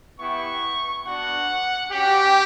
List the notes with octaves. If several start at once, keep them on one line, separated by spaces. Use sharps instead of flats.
B3 E4 G4 C#6
B3 D4 F#4 F#5
C#4 F#4 G4